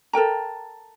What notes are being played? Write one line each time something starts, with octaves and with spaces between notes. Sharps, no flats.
A4 A#4 G5 A#5